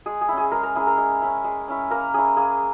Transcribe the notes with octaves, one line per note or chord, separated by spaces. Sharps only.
G#3 G#4
G#4
C#4 E4
G#4
G#3 A#4
A#4
C#4 E4 G#4
A#4
G#3
C#4 E4
G#3
C#4 E4
A#3 A#4
C#4 E4 G#4
A#3 G#4